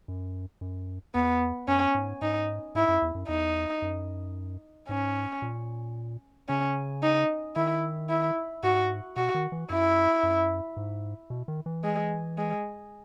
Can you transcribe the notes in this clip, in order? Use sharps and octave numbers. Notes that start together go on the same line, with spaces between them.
F#2
F#2
E2 B3
F#2 C#4
G#2
G#2 D#4
G#2 E4
F#2
E2
F#2
E2 D#4
F#2
G#2 C#4
A#2
C#3 C#4
D#4
D#3 E4
E4
G#2 F#4
B2 F#4
D#3
E3
F#2 E4
F#2
G#2
B2
D#3
E3
G#3
G#3